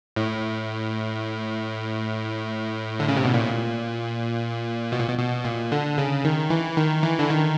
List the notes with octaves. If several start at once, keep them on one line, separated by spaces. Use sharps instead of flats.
A2
D3
C#3
C3
B2
A#2
B2
A#2
B2
B2
A#2
D3
C#3
D#3
E3
D#3
E3
D3
D#3